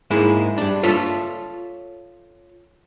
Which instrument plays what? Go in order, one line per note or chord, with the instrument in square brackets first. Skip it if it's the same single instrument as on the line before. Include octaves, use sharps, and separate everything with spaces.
[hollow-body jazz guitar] G#2 G#3 A#3 E4
G2 D4
F4 A4 C#5 E5